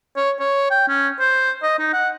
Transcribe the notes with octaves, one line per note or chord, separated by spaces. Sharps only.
C#5
C#5
G5
C#4
C5
D#5
D#4
F#5